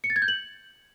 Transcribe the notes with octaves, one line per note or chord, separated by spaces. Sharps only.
C#7
A6
G#6
G6
F#7